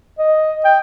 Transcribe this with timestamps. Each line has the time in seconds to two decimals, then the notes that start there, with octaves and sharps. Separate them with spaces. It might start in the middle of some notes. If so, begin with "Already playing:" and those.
0.19 D#5
0.65 G5